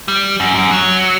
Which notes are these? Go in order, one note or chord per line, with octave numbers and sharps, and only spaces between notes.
G3
F#2
F#2
F#3